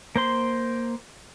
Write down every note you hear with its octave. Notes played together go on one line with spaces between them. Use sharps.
A#3 C5 C6